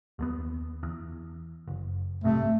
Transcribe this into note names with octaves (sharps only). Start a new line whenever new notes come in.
D#2 A3 B3
E2
F#1
B1 G#2 C3 A3